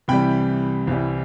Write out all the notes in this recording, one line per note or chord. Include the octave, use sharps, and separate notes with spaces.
C2 C3 E3 G3 G5 B5
C2 C3 E3 G3